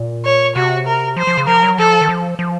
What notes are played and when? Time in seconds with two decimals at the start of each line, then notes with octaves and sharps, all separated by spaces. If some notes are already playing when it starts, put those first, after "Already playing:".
Already playing: A#2
0.25 C#5
0.56 C3 F#4
0.87 A#4
1.17 F3 C5
1.27 F3
1.37 C#3
1.47 F3 A#4
1.63 F#3
1.78 F3 A4
2.01 D#3
2.09 F3
2.39 F3